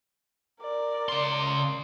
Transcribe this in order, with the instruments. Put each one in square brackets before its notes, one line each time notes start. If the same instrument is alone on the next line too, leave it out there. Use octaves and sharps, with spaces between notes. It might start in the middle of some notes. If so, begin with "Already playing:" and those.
[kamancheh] A#4 D5
[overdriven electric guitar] C#3 C6